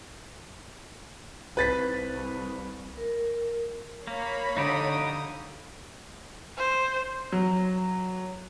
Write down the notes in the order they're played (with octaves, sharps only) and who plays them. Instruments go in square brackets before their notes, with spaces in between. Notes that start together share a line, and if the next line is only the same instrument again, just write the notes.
[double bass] C2 [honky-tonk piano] B4 A6 B6
[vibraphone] A#4
[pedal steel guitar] A#3 [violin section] C#5 F5 B5
[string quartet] D3 D#6 [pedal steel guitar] D#4 F#4 G4
[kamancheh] C5
[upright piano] F#3